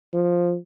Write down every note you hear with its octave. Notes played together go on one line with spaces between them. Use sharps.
F3